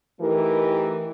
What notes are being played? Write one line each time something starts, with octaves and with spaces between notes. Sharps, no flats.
E3 A3 D#4 G4 A#4